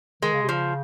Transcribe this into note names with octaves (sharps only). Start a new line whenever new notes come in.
D#3 G#3
C#3
C3
C#3 F3